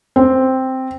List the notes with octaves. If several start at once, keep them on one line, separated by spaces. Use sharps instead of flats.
C4